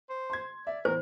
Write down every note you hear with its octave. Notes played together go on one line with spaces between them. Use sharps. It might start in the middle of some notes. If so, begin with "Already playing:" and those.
C5
C6 G#6
D5 E5
E2 A2 E3 A#4 C5